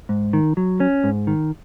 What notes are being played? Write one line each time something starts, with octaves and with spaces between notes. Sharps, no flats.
G#2
D#3
F#3
C#4
G#2
D#3